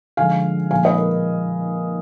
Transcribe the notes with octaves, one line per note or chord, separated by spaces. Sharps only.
D3 F3 G#3 F5 G#5
A#2 F3 G#3 F5 G#5
B4 D#5
A#4